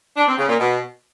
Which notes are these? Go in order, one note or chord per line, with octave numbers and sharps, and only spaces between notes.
D4
C4
C#3
A#2
B2